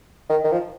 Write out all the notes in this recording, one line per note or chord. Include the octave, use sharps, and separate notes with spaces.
D#3
D#3
F3